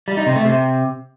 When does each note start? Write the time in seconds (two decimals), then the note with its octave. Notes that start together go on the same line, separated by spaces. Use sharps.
0.08 G3
0.17 D#4
0.26 C3
0.36 A3
0.45 C3